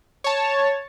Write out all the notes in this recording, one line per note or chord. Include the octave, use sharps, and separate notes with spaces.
C#5 A5